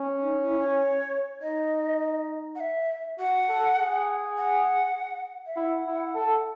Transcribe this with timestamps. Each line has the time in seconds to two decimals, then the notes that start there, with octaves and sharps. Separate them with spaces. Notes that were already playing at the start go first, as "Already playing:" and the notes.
Already playing: C#4
0.22 D#4
0.43 E4
0.62 C#5
1.41 D#4 D#5
2.55 F#5
2.60 E5
3.18 F#4 F#5
3.49 A4
3.79 G#4
4.38 F#5
5.46 E5
5.56 E4 F#5
5.86 E4
6.15 A4